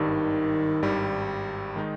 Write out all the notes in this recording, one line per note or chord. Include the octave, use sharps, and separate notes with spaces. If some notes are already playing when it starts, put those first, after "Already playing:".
Already playing: G#1 G2 D#3 G3
G#1 G2 G3
D#3 G#3 D#4